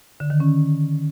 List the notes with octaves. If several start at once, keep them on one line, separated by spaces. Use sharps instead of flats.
D3
D#3
C#4